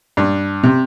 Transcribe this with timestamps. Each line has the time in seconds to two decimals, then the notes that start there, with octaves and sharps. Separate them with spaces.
0.17 G2
0.63 C3